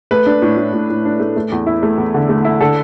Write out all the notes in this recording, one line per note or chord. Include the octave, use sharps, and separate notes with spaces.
A3 B4
D4
A2
A2
A2
A2
D4
A3
A3
E2
E4
A3
E2
D3
A3
E4
D3 A4